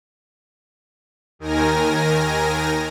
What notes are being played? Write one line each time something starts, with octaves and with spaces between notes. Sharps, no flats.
D#2 D#3 A#4 G#5 A#6